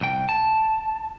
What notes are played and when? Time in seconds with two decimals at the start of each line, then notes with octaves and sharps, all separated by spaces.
0.01 C2 G5
0.29 A5